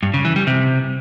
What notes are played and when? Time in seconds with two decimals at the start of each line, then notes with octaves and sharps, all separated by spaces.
0.03 G2
0.14 C#3
0.25 E3
0.36 G3
0.47 C3